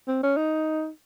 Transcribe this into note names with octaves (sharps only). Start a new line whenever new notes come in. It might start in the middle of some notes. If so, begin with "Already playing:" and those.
C4
C#4
D#4